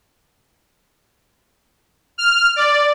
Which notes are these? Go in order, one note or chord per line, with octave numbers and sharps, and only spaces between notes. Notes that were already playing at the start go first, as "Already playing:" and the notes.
F6
D5